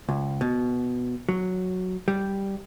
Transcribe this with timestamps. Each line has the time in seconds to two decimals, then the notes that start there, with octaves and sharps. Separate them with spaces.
0.09 C#2
0.41 B2
1.29 F#3
2.08 G3